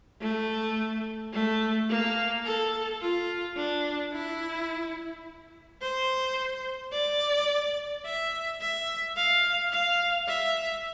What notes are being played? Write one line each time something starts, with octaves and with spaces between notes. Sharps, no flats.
A3
A3
A#3
A4
F4
D4
E4
C5
D5
E5
E5
F5
F5
E5